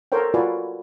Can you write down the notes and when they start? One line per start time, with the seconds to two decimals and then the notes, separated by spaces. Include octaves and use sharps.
0.12 A4 A#4 C5 C#5 G5
0.34 F4 F#4 B4 D5 G#5